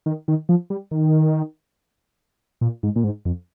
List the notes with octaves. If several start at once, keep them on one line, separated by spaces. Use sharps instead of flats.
D#3
D#3
F3
G3
D#3
A#2
G#2
A#2
G#2
F2